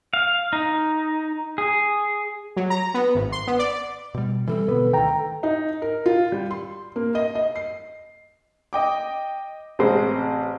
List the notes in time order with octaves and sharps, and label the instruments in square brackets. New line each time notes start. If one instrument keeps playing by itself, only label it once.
[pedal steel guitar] F5
D#4
G#4
[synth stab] F#3
A#5
B3
G#1
C6
B3
D5
[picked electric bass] B2 G3
[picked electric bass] E3 G3 C4 [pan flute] A4
[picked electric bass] B2 D3 B3 [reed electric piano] B4
[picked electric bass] D2 D#3 [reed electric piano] G5 A#5
[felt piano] D#4
A#4
F4
G3
C6
A#3
D#5
D#5
C7
[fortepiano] D#5 G5 D6
A1 C3 G#3 C4 C5